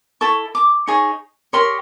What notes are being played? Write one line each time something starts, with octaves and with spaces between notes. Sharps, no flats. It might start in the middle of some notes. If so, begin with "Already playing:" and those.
E4 A4 C#6
D6
D#4 G#4 C#5 C#6
G4 A#4 C#5 C6